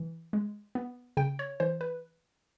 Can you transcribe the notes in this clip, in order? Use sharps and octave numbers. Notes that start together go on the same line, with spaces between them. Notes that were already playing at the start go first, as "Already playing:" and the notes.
Already playing: E3
G#3
B3
C#3 G5
C#5
E3 C5
B4